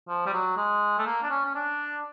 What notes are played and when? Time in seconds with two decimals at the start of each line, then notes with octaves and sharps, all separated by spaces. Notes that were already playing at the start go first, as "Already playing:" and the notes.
0.08 F3
0.26 G3
0.34 F#3
0.57 G#3
0.98 A3
1.06 A#3
1.23 D4
1.30 C#4
1.45 C#4
1.55 D4